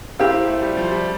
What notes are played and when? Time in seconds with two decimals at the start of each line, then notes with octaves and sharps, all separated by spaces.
0.19 C4 E4 G4 A#4 F5
0.33 C4
0.47 A3
0.62 G3
0.77 F3
0.92 G3